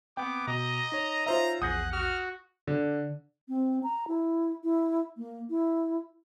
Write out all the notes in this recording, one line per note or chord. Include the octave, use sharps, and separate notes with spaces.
B3 C4 G5 D6
B2 D#5 A#5
D#4 C#5
F4 C5 E5 A#5
A#1 E2 G#4 F#5 D#6 G6 A#6
F#4 F6
D3
C4
A#5
E4
E4
A#3
E4